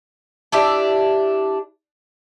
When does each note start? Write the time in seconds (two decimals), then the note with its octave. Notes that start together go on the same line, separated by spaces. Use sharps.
0.52 D4 E4 G4 E5